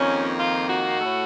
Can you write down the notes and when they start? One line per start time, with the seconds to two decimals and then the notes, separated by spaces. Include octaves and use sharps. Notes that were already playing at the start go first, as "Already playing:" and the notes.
Already playing: F2 D#3 A#3 C#4
0.37 F4
0.69 F#4
1.00 A2 A3